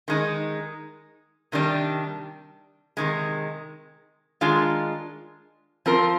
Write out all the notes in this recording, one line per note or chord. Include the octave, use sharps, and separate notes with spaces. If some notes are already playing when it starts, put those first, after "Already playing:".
D#3 G#3 D#4
C3 D#3 G3 D4
C3 D#3 G#3
D#3 G#3 D4 F4
F3 C4 F4 A#4